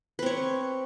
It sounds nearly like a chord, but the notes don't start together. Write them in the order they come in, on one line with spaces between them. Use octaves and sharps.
B4 C4 C#5